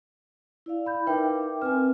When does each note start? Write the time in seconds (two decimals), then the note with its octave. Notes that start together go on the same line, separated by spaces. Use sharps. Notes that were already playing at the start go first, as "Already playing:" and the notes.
0.66 E4 D5 F5
0.86 B5 G6
1.07 D#4 A#4 B4 E5 G5 D6
1.61 C4 A#4 B4 G#5 F6